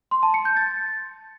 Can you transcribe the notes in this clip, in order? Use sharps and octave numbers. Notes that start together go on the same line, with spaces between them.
C6
A5
C#7
G6
A6